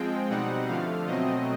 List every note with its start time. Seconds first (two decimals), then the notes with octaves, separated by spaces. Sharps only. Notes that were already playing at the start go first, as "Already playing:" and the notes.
Already playing: F3 G#3 C4 G5
0.30 B2 G3 C4 D#4 F#5
0.68 D3 F3 A3 F5
1.07 B2 F#3 A3 C4 D#5